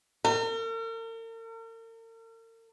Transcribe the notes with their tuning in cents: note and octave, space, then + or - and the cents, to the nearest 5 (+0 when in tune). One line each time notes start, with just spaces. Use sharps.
A#4 -45